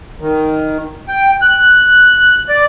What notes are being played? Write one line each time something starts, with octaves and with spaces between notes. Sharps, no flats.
D#3
G5
F#6
D5